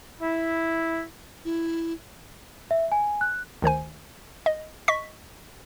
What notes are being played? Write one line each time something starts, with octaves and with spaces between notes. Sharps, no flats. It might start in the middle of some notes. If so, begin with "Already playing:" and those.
E4
E4
E5
G#5
F#6
D2 D#3 C5 G#5
D#5
D#5 C#6 B6